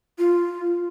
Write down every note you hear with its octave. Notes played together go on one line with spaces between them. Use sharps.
F4